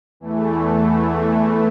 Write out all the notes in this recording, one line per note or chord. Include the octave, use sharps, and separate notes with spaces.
E2 E3 A3